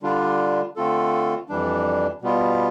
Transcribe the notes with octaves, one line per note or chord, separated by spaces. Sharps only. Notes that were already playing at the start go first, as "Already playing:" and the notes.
D3 G3 D4 F4
D3 A3 C4 F4 A4
F2 E3 G3 D4
B2 G3 B3 F4